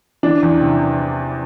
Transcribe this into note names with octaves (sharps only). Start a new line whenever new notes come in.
E3 D4
E2
C3